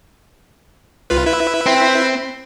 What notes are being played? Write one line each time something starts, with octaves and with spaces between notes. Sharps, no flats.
C2 F4 B4
E4 B4 E5
C4